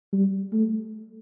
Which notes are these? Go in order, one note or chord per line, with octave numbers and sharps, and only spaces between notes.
G3
A3